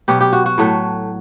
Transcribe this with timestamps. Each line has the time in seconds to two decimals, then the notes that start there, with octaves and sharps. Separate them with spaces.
0.08 B2 F#3 B3 G4
0.21 G4
0.33 F#4
0.46 F#4
0.58 A2 F#3 A3